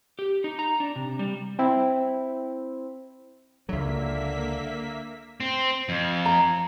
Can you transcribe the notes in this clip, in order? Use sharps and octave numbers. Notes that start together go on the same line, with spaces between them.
G4
D#4
A#5
D4
C3
G3
C4 E4
C#2 D3 F#3 A#3 E5 B6
C4
F2
A#5